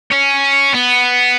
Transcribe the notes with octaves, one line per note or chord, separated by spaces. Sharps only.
C#4
B3